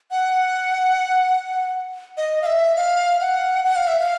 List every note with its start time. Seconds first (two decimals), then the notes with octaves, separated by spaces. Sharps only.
0.11 F#5
2.17 D#5
2.42 F5
2.46 E5
2.77 F5
3.21 F#5
3.64 F#5
3.76 F5
3.87 E5
4.00 F5